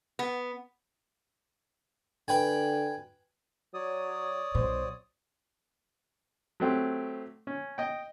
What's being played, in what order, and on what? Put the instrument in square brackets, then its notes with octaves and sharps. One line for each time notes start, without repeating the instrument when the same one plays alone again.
[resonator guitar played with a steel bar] B3
[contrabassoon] D3 [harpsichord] B4 G5 G#5
[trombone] F#3 [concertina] C#5 D5 D#6
[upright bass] B1 B2 [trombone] C5
[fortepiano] F#3 A3 C4 G4
C#4
D#5 G5